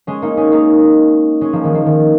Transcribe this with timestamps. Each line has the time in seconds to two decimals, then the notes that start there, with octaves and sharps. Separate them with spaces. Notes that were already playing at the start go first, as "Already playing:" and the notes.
0.07 G#3 C#4
0.22 A#3 D#4
0.37 G#3 C#4
0.52 A#3 D#4
1.41 G#3 C#4
1.53 F3 A#3
1.64 D#3 G#3
1.75 F3 A#3
1.86 D#3